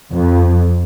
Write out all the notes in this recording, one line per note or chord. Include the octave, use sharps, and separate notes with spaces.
F2